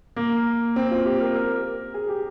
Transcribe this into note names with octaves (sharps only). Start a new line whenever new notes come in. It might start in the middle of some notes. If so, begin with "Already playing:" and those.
A#3
C4
F4
G4
A#4
A#4
G#4
G4